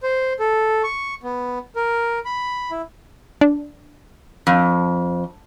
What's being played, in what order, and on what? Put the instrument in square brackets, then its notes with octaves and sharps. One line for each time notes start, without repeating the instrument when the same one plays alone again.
[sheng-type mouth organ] C5
A4
C#6
B3
A#4
B5
E4
[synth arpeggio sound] D4
[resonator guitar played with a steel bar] F2